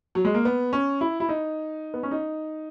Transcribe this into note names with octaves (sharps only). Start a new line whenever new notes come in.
F#3
G#3
A#3
B3
C#4
E4
E4
D#4
B3
C#4
D#4